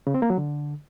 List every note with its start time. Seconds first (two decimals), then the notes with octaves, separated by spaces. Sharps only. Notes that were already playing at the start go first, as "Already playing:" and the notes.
0.07 C#3
0.14 C4
0.22 A#3
0.30 F#3
0.38 D3